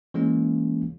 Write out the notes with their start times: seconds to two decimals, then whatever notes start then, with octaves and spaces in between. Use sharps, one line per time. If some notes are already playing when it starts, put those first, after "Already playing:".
0.14 E3 G#3 A#3 C#4 F4